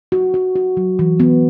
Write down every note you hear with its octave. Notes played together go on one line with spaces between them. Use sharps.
F#4
F#4
F#4
F#3
E3
B3